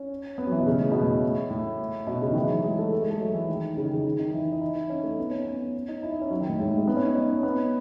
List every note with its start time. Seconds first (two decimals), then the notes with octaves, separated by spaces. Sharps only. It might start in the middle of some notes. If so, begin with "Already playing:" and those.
Already playing: C#4
0.38 B3
0.47 F#3
0.52 E3
0.59 B2
0.66 C#3
0.80 A2
0.92 B2
1.03 A2
1.50 A2
2.07 B2
2.21 C#3
2.32 D#3
2.35 E3
2.50 F#3
2.63 G#3
2.79 A3
2.92 A3
3.02 G#3
3.10 A3
3.21 F#3
3.34 E3
3.48 D#3
3.77 C#3
3.85 D#3
3.92 C#3
4.04 D#3
4.19 D#3
4.33 E3
4.52 D#4
4.61 E4
4.76 D#4
4.89 C#4
5.03 A3
5.18 B3
5.31 C#4
5.45 B3
5.88 D#4
6.03 E4
6.12 D#4
6.21 C#4
6.30 F#3
6.41 D#3
6.49 A2
6.60 G#2
6.69 A2
6.77 G#3
6.87 B3
6.97 C#4
7.06 D#4
7.15 C#4
7.43 B3